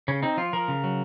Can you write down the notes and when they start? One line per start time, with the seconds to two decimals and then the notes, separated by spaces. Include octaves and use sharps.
0.08 C#3 C#4
0.23 C4 D#4
0.37 F3 F4
0.53 F3 A#4
0.68 C#3
0.84 F#3